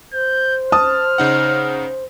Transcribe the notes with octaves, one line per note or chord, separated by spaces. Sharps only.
C5 G6
A5 D#6 F6
C#3 D#4 F#5